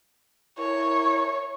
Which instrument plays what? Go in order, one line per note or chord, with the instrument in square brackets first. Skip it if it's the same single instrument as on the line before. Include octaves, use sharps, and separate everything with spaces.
[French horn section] E4 A#4 [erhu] C#5